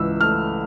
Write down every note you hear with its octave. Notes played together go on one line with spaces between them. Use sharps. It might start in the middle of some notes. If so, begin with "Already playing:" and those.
Already playing: C#2 E3 E6
A3 F6